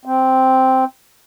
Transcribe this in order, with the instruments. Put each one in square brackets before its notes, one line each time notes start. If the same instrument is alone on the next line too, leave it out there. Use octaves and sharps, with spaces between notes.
[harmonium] C4